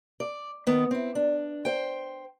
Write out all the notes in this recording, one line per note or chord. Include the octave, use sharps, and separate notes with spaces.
D5
D#3 B3
C4 E4
D4
C5 G5